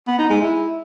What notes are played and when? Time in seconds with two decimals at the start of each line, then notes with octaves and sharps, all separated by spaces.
0.07 B3
0.19 D#4
0.30 G#3
0.41 E4